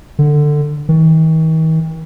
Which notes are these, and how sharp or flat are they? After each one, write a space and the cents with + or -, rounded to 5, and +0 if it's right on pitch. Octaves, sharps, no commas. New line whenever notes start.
D3 +15
D#3 +45